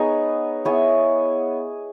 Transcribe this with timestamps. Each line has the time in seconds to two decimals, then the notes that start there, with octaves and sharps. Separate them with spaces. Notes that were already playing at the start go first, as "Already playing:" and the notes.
Already playing: B3 D#4 G#4 C#5
0.65 B3 E4 G#4 C#5